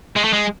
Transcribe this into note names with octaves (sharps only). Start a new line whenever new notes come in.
G#3
A3
G#3